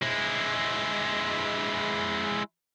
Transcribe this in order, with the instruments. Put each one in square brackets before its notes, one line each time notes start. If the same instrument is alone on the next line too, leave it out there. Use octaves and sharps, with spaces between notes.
[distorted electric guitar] G#3 E4